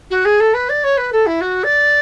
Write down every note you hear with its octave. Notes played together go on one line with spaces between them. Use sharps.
F#4
G#4
A4
B4
D5
C#5
B4
A4
E4
F#4
D5